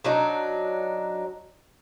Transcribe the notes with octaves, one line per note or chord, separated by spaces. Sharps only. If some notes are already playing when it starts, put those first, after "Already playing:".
F#3 D4 D#4